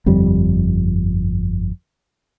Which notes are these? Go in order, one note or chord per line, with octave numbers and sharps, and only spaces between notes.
G1 F2 G3